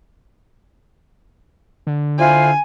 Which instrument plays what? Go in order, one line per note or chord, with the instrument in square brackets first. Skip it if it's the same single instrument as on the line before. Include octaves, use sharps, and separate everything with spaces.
[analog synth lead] D3
[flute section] E4 F4 C5 [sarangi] G#5